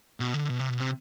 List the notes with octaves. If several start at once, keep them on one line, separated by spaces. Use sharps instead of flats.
B2
D3
B2
C3
B2
C3